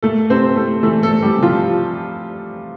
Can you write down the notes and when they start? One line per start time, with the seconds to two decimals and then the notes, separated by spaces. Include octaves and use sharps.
0.02 A3 A#3 A4
0.30 C3 C4 C5
0.56 C3 A3 A4
0.83 E3 A3 A4
1.02 A3 A4
1.09 A#3
1.22 G3 G4
1.36 C3
1.43 F3 F4